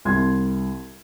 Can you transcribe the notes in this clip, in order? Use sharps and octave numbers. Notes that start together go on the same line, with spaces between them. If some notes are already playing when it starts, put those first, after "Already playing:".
C2 C6 G#6